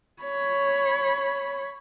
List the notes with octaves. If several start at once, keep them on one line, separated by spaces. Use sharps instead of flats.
C#5 B5